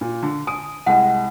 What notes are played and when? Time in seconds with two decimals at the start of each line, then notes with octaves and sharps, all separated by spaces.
0.01 A#2
0.23 D3
0.47 G#5 D#6
0.86 C2 G#3 F#5